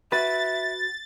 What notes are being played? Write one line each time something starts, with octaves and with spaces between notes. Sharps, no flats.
F#4 B4 E5 A6